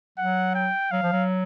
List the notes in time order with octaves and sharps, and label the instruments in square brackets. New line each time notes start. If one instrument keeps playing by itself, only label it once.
[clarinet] F#3 [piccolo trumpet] F#5
[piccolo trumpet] G5
[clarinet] F#3 [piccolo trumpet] F5
[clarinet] F3
F#3